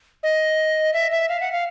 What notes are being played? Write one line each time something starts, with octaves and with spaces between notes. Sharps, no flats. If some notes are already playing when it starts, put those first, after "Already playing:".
D#5
E5
E5
F5
F#5
F5